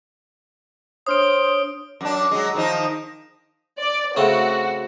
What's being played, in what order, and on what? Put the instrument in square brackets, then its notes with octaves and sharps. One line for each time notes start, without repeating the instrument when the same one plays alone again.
[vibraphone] D4 C#5 [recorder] C5 [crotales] D#6 F6 D7
[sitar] F#2 D4
F#3 G#3
D#3 F3 D#4
[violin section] D5
[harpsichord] C#3 A3 C4 [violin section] F#4